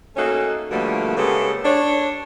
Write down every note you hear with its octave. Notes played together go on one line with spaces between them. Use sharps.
A3 A#3 C#4 D#4 F#4 A4
B2 D3 F3 G3 A3 A#3
C#3 G#3 A#3 B3 G4 A4
D4 C#5